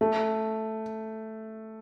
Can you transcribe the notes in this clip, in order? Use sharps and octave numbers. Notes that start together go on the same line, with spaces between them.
A3